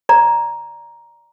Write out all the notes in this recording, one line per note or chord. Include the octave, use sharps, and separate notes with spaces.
D5 A#5